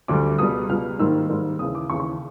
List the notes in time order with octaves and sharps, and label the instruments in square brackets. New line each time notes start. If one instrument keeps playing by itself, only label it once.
[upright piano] D2 D3 G3 D6
C#2 B2 G3 D#6
C#2 B2 G3 F6
G#2 D#3 G3 A#3 E6
G#2 D#3 G3 A#3
D#2 C#3 E3 D#6
D6
D#2 C#3 E3 C#6
C#6